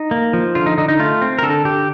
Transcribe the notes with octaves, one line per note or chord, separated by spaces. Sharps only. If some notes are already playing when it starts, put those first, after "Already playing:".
Already playing: D#4
A#3
F3
D3 F4
D#4
D3 D#4
D#4
A3 F4
C4
A#4
D3 A4
D3 G4